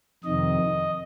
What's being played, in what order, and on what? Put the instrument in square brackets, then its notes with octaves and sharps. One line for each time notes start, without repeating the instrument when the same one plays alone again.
[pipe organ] F2 C3 D#3 D#5